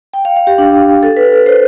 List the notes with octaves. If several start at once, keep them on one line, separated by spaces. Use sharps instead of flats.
G5
F5
F5
G4
D4
A4
B4
A4
C5